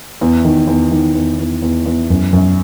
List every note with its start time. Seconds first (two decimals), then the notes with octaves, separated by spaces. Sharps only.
0.21 E2
0.45 D#3
0.67 E2
0.92 D#3
1.15 E2
1.39 E2
1.62 E2
1.86 E2
2.10 F#2
2.33 F#2